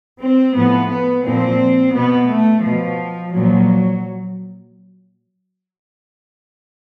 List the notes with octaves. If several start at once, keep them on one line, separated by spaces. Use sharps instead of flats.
C4
A2 F3 B3
B3
A#2 F3 C4
B2 B3
A3
B2 F3
A#2 F3 F#3